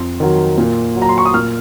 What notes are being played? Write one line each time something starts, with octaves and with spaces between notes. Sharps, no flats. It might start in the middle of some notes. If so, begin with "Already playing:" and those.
Already playing: F2 C6
D#3 F#3
A#2
F#3
A#5
C6
C#6
D#6
A#2 F6